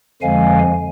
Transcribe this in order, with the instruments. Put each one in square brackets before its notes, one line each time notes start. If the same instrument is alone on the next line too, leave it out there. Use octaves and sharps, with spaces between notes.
[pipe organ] F2 D3 F3 G#3 F5 G#5